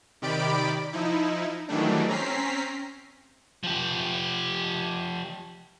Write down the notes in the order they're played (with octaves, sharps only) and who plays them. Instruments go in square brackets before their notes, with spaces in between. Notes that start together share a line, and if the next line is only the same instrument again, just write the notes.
[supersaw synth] C3 D#3 G4 D5 B5 D7
F3 D#4 E4
D#3 E3 F#3 G3 A3 D4
C4 C#4 A#5 B6 C7
[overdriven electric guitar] F3 G4